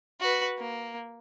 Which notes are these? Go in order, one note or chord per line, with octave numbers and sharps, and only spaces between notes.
F#4 B4
A#3